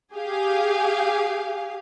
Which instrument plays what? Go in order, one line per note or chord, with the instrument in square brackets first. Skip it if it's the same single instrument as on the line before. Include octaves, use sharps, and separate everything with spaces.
[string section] G4 G#4 F5